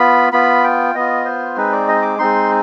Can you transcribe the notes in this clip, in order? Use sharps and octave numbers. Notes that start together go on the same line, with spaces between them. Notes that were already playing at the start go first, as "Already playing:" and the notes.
Already playing: B3 F4 B5
B3 F4 B5
G5
B3 F4 D#5
C5
G#3 C4 D#4 B4
D5
D#5
D6
G#3 C4 D#4 C6